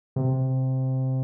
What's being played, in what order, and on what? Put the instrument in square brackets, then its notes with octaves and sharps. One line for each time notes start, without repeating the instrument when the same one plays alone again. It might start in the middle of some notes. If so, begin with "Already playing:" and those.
[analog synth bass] C3